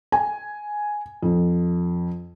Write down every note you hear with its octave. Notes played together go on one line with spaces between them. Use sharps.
G#5
F2